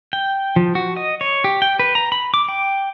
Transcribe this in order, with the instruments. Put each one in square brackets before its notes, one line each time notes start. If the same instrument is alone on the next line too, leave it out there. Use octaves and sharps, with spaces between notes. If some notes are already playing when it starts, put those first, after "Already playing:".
[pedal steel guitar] G5
F3
F#4
D#5
C#5
G4
G5
B4
A#5
B5
D6
G5